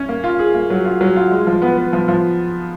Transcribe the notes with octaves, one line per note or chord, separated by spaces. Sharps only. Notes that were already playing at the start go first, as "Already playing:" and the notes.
Already playing: C#4
A#3
F4
G#4
A#3
F#3
F4
F#3
F4
G#3
F3
B3
B3
F3
F3